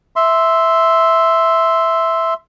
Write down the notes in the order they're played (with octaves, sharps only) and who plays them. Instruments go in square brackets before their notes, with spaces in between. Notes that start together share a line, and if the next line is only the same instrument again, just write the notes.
[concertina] E5 C6